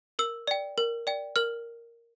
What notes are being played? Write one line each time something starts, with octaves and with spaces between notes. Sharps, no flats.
A#4 E6
D5 G5
A#4
D5 G5
A#4 F6